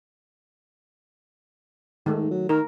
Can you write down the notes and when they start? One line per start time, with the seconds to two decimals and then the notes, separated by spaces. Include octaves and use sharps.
2.06 G#2 D#3 A3
2.31 F#3
2.49 D#3 A#4